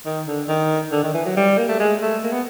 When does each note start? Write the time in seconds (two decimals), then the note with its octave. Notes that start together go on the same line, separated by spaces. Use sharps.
0.06 D#3
0.27 D3
0.48 D#3
0.92 D3
1.03 D#3
1.14 E3
1.25 F#3
1.37 G3
1.58 A#3
1.69 A3
1.79 G#3
2.02 A3
2.24 A#3
2.32 B3